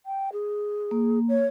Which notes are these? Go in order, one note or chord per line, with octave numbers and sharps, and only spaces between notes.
G5
G#4
A#3
C#5